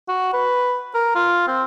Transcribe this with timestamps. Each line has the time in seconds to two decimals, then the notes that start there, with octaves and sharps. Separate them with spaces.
0.08 F#4
0.33 B4
0.94 A#4
1.15 F4
1.47 C4